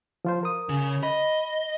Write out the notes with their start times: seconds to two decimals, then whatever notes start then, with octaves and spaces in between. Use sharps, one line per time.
0.25 F3 F4 C5
0.43 A#4 D#6
0.69 C#3
1.03 D#5 B5